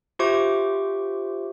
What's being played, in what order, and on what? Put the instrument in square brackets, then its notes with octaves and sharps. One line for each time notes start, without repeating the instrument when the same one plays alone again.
[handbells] F4 G4 C5 E5 C#6 D6